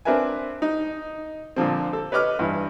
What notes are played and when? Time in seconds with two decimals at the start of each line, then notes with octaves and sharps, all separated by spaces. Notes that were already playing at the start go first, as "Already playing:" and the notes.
0.05 C4 D4 A#4 B4 E5 G#5
0.62 D#4
1.56 A#2 D3 F3 C4
1.93 A4
2.12 B4 C#5 D#5 D6 F6
2.39 G2 E3